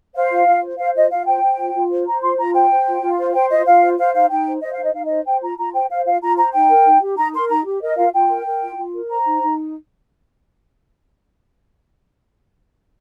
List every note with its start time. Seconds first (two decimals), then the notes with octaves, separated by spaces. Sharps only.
0.15 C5 F5
0.31 F4
0.47 F4
0.63 C5
0.79 C5 F5
0.95 F4 D#5
1.11 F4 F5
1.26 C5 G5
1.43 C5
1.59 F4
1.74 F4
1.91 C5
2.07 C5 A#5
2.22 F4 C6
2.39 F4 A#5
2.54 C5 G5
2.71 C5
2.87 F4
3.03 F4
3.18 C5
3.34 C5 G5
3.51 F4 D#5
3.66 F4 F5
3.82 C5
3.99 C5 F5
4.14 D#4 F5
4.30 D#4 G5
4.47 C5
4.62 C5 D#5
4.73 F5
4.79 D#4 D#5
4.94 D#4 F5
5.05 D#5
5.10 C5
5.26 C5 G5
5.42 F4 A#5
5.58 F4 A#5
5.74 C5 G5
5.90 C5 F5
6.06 F4 F5
6.21 F4 A#5
6.37 C5 A#5
6.53 D#4 G5
6.70 A#4
6.86 D#4
7.01 G4
7.17 D#4 A#5
7.34 A#4 C6
7.49 D#4 A#5
7.66 G4
7.82 A#4 D#5
7.97 F4 F5
8.14 F4 G5
8.30 A#4
8.46 A#4
8.62 F4
8.77 F4
8.94 A#4
9.09 C5 A#5
9.26 D#4
9.42 D#4